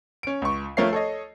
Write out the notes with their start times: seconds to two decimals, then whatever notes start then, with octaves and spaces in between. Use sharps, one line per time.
0.23 C#4 D7
0.42 C#2 C#6
0.77 F3 A3 A#4 C#5 F5 C7
0.93 A4 C#5 D#5